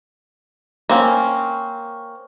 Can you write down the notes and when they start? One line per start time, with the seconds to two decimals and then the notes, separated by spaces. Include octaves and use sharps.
0.89 A#3 C4 C#4